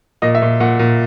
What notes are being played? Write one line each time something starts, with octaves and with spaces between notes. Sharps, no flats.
A#2 D#5
E5
A#2
A#2 F#5
A#2